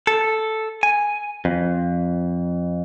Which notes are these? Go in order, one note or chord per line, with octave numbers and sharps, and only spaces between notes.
A4
G#5
F2